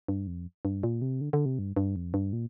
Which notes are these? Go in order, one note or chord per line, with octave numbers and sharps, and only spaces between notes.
G2
F2
G2
A#2
C3
D3
D3
C3
G2
G2
F2
G2
A#2